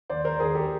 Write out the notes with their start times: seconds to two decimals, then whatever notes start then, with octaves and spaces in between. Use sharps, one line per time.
0.10 D#2 C5 D5
0.25 A#4 C5
0.40 D#2 G#4 A#4
0.55 G4 A4